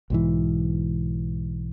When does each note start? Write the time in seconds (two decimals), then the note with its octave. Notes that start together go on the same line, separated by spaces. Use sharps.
0.10 B1 G#2 E3